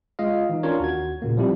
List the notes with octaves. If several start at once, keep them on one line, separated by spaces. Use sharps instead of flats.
G#3 F4 D#5 F5
E3 D#4
C#4 D4 F4 A#4 C#5
D#2 F#4 G#6
A#2 C#3 A#3
F3 G3 C4 E4 G4